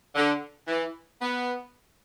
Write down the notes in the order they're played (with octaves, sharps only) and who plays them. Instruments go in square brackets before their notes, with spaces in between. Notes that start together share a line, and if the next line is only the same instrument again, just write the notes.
[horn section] D3
E3
B3